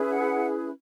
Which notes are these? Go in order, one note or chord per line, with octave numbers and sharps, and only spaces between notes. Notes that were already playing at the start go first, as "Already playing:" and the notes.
Already playing: C#4 E4 G#4 B4
F#5